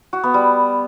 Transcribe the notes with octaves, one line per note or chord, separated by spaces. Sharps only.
F#4
B3
G3